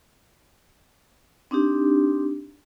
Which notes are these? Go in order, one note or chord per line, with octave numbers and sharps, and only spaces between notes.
C4 D4 D#4 G4